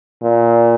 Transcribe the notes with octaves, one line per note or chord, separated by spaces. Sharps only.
A#2